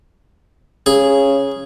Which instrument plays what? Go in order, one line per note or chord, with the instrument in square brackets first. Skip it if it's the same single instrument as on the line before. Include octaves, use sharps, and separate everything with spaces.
[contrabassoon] C#3 [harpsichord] G#4